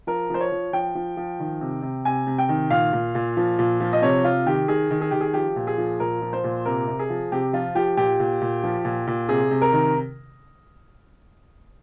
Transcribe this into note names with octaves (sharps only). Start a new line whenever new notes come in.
F3 A#4
F3 C5
C#5
F3
F3 G5
F3
F3
D#3
C3
C3
C3 G#5
C3
G5
D#3
A#2 F5
A#2
A#2
F3
A#2
F3
D#5
C3 C#5
C3 F4
D#3 G4
D#3 G#4
D#3
G#4
D#3 G4
G#4
F3 G4
A#2
G#4
F3
A#2 A#4
F3
C5
A#2
C3 A#4
C3
G#4
F3
C3 G4
F3 F4
F3 G4
A#2 G4
A#2
A#2
F3
A#2
A#2
C3 G#4
C3
A#4
D#3